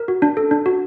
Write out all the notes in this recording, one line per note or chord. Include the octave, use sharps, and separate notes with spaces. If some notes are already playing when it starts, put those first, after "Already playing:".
Already playing: A#4
F#4
D4
A4
D4
F#4